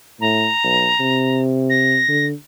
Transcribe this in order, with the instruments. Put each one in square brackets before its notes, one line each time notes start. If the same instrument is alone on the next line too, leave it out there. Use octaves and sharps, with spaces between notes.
[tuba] A2 [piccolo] A#5
[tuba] B1
C3
[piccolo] A#6
[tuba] D3